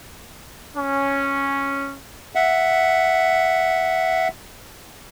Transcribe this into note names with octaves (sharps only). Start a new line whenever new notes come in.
C#4
E5 F#5